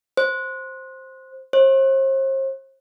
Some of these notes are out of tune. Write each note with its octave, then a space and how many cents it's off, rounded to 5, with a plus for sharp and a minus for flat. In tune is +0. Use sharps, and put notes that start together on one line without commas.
C5 +5
C5 +40